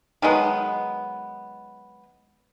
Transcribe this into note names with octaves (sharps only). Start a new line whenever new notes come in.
D#3 F#3 G#3 B3